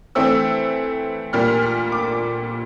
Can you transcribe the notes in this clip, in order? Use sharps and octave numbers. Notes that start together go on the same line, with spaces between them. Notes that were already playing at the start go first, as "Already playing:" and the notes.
E3 A3 C4 E6
A#2 G3 A#3 F6
F6
F6
D6